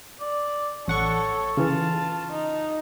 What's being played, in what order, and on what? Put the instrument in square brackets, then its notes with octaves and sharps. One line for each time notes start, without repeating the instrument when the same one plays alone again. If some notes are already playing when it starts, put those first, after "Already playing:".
[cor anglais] D5
[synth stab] A1 F#5 C#6 [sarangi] A4 [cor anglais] C#5
[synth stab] C#3 E3 [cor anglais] F4 [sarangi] A5
[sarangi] D#4